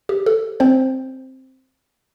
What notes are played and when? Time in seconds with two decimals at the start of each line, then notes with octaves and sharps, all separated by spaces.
0.09 G4
0.26 A4
0.60 C4 C5